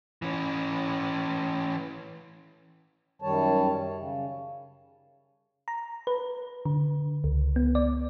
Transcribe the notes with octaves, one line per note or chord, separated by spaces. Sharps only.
E3 C#4
F#2 D#3 G3 C#5 A5
C#3
A#5
B4
D3
C#2
B3
D5